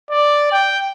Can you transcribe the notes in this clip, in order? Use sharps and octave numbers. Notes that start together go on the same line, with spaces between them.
D5
G5